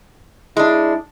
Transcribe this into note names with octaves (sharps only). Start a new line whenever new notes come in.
G#3 D4 E4